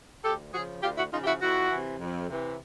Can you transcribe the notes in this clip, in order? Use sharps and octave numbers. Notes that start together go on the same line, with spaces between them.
D2 G4 A4
C#3 F3 F#4 G#4
D2 F4 G4
E4 F#4
C#3 F3 D#4 F4
G4
E4 F#4
F2 E4 F#4
C3 E3
F2
C3 E3